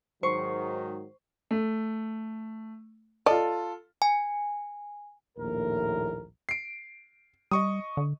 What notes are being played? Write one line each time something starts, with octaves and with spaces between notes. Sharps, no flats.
G#2 D#3 F#3 C5 C#6
A3
F4 A4 D5 D#5
G#5
A#1 D#2 A2 A#4
C7 D7
G3 D#5 C#6 D#6
D3